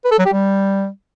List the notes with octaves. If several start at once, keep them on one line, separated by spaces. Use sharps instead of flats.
B4
A4
F#3
G4
G3